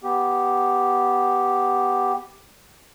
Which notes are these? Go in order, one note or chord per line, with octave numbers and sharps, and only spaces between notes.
B3 G4